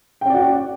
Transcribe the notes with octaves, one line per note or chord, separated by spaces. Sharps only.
C#4 F#4 D5 G5